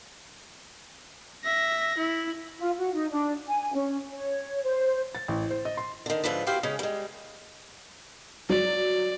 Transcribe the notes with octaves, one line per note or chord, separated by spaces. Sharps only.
E5 A#6
E4
F4
F#4
D#4
D4
G#5
C#4
C#5
C5
A6
A1
C5
D#5
C6
D3 D#3
G#2 D3 F3 A3 B4
C4 E4 F#4 G4 C5 F5
C#3 G#3 C#4
G3 G#3
F#3 D5